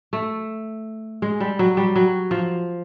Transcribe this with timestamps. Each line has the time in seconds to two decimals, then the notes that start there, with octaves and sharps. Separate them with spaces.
0.13 A3
1.22 G#3
1.40 G3
1.59 F#3
1.77 G3
1.95 F#3
2.31 F3